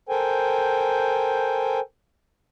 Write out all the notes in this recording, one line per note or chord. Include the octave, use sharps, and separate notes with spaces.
A4 A#4 C5 G5 G#5